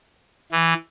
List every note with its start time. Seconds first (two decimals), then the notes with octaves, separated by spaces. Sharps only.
0.52 E3